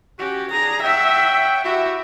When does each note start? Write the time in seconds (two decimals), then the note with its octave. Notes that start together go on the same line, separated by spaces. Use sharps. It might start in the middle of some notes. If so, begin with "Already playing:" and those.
0.19 C#4 F#4 G4
0.51 D4 G#4 A#5
0.83 C#5 E5 F#5 G5
1.64 E4 F#4 G4 E5